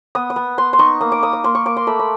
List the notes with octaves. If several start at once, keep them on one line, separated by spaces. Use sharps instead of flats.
B3 D#6
D#6
B3
B3 C6
C6
D#4 C#6
A#3 D#6
D6
A#3 D#6
D6
A#3 C6
C#6
A#3 D6
C6
A3 B5
B5